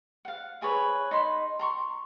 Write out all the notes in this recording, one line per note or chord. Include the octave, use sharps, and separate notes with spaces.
F5 F#5
E4 G#4 B4 C#5
D#4 B5 C6
A#5 C6 C#6